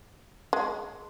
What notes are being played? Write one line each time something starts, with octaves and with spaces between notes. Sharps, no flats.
G#3